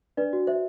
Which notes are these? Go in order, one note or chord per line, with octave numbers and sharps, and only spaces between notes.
D4 B4 D5
F#4
C5 E5